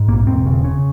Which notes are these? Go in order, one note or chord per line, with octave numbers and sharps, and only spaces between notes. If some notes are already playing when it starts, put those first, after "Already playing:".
Already playing: G#2
A#1 A#3
E1 C4
C#3
C#3